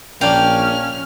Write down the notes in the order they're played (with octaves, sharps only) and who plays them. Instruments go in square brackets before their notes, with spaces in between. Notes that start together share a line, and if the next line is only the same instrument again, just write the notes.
[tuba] A#1 [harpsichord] A#3 D4 F5 [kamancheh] C#4 F6 [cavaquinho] G5